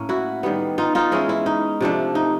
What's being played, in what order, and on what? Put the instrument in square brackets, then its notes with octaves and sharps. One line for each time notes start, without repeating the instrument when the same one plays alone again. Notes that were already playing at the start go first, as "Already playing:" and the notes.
Already playing: [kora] A2 A#3 C#4
E4 F#4
D#3 G3 B3
D#4 F4
D#4 F4
E3 G#3 C#4 E4
E4
D#4
C3 F3 A3 D4
D#4